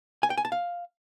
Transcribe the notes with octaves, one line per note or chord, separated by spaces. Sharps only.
G#5
G5
G#5
A5
F5